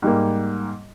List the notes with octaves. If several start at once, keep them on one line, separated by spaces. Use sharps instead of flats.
G#2 G3 A#3